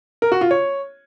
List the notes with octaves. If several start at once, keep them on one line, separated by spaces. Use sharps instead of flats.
A#4
F#4
F4
C#5